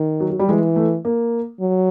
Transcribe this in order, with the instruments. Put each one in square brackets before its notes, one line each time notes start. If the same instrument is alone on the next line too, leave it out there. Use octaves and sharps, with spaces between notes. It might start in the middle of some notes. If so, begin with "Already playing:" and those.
Already playing: [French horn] D#3
[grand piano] F#3
F#3
G3
[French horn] E3 [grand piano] G#3
[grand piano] A3
A#3
[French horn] F#3